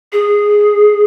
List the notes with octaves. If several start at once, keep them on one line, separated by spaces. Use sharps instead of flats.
G#4